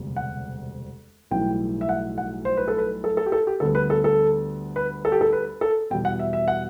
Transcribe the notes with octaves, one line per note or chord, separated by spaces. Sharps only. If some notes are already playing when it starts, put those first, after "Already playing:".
Already playing: E1 D2 C3 G3 B3
F#5
B1 A2 E3 G3 G5
E5
F#5
F#5
C5
B4
A4
B4
A4
A4
G4
A4
G4
D2 D3 G3 B3 A4
B4
A4
A4
B4
A4
G4
A4
B4
A4
E2 B2 G3 B3 G5
F#5
E5
E5
F#5